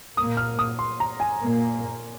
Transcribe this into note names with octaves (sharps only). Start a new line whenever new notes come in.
A#2 A#3 D#6
F6
D#6
C6
A#5
G#5
A#2 A#3